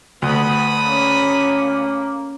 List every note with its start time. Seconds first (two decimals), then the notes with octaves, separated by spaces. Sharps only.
0.22 D2 B3 B5 D#6
0.85 A#3 C#4